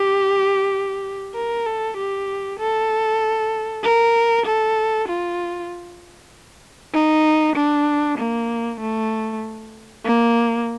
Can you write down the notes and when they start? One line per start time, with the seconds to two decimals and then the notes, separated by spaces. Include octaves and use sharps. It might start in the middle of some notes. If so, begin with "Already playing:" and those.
Already playing: G4
1.35 A#4
1.66 A4
1.97 G4
2.59 A4
3.84 A#4
4.46 A4
5.08 F4
6.94 D#4
7.56 D4
8.19 A#3
8.80 A3
10.05 A#3